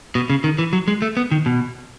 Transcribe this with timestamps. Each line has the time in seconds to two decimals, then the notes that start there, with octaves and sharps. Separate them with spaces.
0.15 B2
0.30 C#3
0.44 D#3
0.58 E3
0.73 F#3
0.88 G#3
1.02 A3
1.17 B3
1.31 D#3
1.46 B2